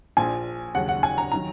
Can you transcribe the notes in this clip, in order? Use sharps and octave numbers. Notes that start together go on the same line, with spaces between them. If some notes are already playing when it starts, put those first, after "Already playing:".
A#1 A#2 F3 G#5
D#2 C#3 F#3 F#5
F#5
G#5
A#5
D#3 F#3 A#5